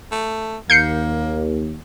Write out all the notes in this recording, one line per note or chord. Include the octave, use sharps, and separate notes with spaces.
A3
D#2 A#3 G6 C7 C#7